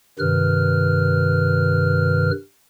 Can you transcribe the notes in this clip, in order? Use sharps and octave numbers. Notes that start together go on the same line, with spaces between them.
G2 C3 D#3 B4 F6